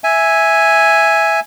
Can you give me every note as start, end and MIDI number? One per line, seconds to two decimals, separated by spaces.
0.04 1.40 76
0.04 1.40 80